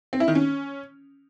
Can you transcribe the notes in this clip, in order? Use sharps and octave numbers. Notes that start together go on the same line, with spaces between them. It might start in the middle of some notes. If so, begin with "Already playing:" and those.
C4
E4
D#3
C#4